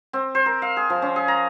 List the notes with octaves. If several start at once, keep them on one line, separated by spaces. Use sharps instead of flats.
C4
C5
A#4
F5
G#4
F3
C#4
G#4
A#5